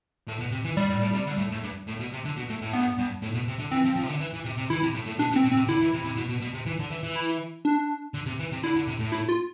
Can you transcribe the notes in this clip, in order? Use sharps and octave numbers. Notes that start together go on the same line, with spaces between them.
A2
B2
C3
E3
G2 G3
A2
A2
C3
D3
A2
A2
G2
A2
B2
C3
D3
B2
A2
A2
G2 B3
G2
A2
B2
C3
D3
E3 C4
F3
F3
C3
D3
E3
E3
C3
C3
E3 E4
C3
A2
A2
B2 D4
B2
C4
B2
C4
C3
D3 E4
E3
C3
C3
B2
B2
B2
C3
E3
D3
E3
E3
E4
D4
D3
C3
E3
C3
D3 E4
D3
C3
A2
E4
F4